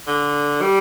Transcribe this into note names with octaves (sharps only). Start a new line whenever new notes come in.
D3
G3